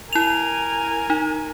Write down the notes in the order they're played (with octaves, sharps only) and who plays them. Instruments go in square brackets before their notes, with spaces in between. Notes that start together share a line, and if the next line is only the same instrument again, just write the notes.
[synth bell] E4 F7 [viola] A#4 G#5
[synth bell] D#4